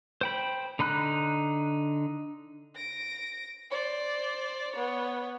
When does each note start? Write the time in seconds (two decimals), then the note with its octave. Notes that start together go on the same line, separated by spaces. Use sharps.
0.21 C5 G5 B5
0.79 D3 D#4 B5 F#6
2.75 A#6 D7
3.70 C5 D5
4.72 B3 C#5